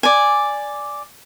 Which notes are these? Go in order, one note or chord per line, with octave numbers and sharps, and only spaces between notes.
D5 G#5